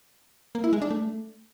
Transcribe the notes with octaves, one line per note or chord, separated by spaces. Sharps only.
A#3
E4
G#3
D4
A3